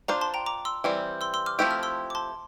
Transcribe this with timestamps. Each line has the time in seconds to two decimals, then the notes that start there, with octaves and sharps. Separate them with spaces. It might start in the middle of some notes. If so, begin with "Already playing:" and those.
0.08 D4 F4 C5 A#5 D6
0.21 A5 C6
0.34 G5 A#5
0.46 A#5 D6
0.65 C6 E6
0.84 E3 G3 C4
1.21 C6 E6
1.34 C6 E6
1.46 D6 F6
1.59 F3 A3 C4 E4 G4 E6
1.71 F6
1.83 C6 E6
2.10 D6
2.15 A5 C6